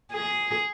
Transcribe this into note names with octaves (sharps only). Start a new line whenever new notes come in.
G#4